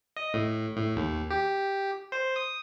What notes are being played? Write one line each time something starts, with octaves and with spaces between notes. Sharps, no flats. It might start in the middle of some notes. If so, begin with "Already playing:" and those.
D#5
A2
A2
D#2
G4
C5
D#6